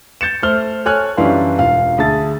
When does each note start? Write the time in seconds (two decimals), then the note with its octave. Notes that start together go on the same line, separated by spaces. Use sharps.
0.21 G6 A6 C#7 E7
0.43 A3 C5 F6 G7
0.86 A4 C#5 G#5 F6 F#6
1.17 F#2 E3 G3 D4 F5 C6
1.58 E1 F4 F5
1.98 D2 G#4 A5 A6